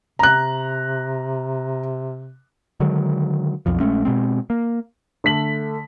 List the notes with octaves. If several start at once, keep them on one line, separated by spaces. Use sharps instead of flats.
C3 A#5 F#6
D3 D#3 F#3 G#3
B1 F2 F3
A#1 G#3 A3 C#4
B2 G#3 C4
A#3
D3 A3 B6 F#7